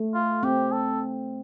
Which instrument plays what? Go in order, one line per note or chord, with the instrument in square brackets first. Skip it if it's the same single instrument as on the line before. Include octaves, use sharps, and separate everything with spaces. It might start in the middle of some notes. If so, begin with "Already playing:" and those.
Already playing: [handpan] A3
[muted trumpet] F4
[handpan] C4 [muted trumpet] G4
[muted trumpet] A4